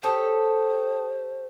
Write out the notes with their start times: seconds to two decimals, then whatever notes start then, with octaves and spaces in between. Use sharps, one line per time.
0.03 G4 A4 C5 C#5 G5 A5 D#6